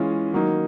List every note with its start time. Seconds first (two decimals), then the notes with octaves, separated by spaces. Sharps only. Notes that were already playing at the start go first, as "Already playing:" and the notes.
Already playing: E3 G#3 C#4 F4
0.33 D#3 F#3 A#3 D#4